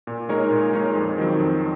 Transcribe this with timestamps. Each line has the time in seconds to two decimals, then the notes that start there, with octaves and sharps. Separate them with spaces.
0.07 A#2
0.29 G#3 D#4 A#4 C#5
0.51 A#2
0.74 G#3 D#4 A#4 C#5
0.95 F2
1.18 D#3 F#3 C4
1.40 F2